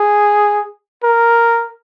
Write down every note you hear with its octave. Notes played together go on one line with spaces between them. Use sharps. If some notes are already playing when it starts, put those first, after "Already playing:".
Already playing: G#4
A#4